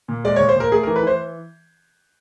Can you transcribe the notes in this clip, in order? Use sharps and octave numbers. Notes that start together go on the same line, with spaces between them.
A#2
G#3 D5
A#2 C#5
C5
A#2 A#4
A3 G#4
E3 A#4
B4
E3 C5